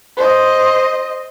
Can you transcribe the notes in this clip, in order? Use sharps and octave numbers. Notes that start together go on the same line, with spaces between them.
C5 D#5